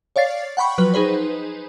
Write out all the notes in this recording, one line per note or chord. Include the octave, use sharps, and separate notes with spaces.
C#5 D5 F5 A6 C7
F#5 G5 B5 C#6
F3 F#3 B4
D#4 G#4 B4 C5